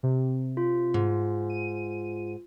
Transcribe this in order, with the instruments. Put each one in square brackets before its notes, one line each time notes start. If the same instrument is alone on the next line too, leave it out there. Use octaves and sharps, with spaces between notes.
[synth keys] C3
[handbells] F4
[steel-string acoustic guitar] G#2
[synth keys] D#7